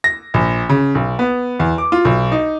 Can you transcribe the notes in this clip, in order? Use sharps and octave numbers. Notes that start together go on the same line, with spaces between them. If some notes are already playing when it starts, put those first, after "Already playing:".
A#6
A#1
C#3
B1
B3
E2
D6
F4
B1
D#4